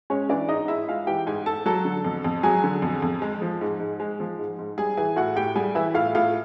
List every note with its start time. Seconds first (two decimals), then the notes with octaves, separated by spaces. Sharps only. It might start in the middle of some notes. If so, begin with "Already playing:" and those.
0.10 G#3 C#4 C#5
0.29 E3 D4 D5
0.49 G#2 D#4 D#5
0.68 G#2 E4 E5
0.88 G#3 F4 F5
1.07 E3 G4 G5
1.26 G#2 G#4 G#5
1.46 G#2 A4 A5
1.66 F#3 A4 A5
1.85 D3
2.05 F2
2.24 F2
2.43 F#3 G#4 G#5
2.64 D3
2.82 F2
3.02 F2
3.22 G#3
3.42 F3
3.61 G#2
3.80 G#2
4.00 G#3
4.20 F3
4.39 G#2
4.59 G#2
4.78 G3 G#4 G#5
4.97 E3 G#4 G#5
5.16 A2 F#4 F#5
5.36 A2 G4 G5
5.56 G3 G#4 G#5
5.75 E3 E4 E5
5.94 A2 F4 F5
6.15 A2 F4 F5